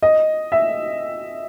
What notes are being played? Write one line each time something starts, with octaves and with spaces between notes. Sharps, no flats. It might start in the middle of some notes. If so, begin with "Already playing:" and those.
D#5
E5